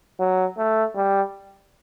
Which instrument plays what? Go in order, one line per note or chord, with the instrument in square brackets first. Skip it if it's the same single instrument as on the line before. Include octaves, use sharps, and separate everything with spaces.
[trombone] F#3
A3
G3